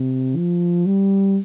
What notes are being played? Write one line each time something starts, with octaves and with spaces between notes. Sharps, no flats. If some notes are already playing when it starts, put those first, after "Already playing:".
Already playing: C3
F3
G3